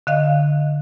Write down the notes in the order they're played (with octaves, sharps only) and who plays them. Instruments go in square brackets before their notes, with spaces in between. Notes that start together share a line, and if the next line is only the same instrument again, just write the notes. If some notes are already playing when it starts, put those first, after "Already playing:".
[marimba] D3 D#5 F5